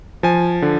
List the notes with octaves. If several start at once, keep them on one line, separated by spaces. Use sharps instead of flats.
F3 G#5
D3